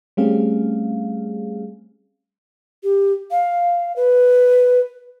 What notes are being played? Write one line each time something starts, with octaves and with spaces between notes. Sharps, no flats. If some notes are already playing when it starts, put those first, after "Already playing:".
G3 A3 C4 C#4 G#4 F5
G4
F5
B4